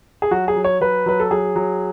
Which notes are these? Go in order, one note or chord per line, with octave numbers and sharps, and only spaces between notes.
G#4
F#3 F#4
G#4
F#3
C#5
F#3 B4
F#3 B4
A4
F#3 G#4
F#3